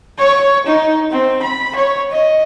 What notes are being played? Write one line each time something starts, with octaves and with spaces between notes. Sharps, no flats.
C#5
D#4
C4
B5
C#5
D#5